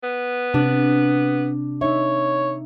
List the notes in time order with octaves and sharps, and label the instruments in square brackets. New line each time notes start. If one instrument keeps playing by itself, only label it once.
[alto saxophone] B3
[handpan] C3 [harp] D4
[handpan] D#4 E5 [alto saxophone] C#5